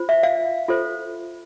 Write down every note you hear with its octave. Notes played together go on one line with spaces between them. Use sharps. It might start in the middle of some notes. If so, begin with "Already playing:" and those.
Already playing: F4 C5
E5
F5
F4 A4 C5